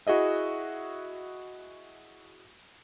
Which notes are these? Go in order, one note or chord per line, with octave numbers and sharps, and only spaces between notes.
E4 F#4 G#4 D#5 E5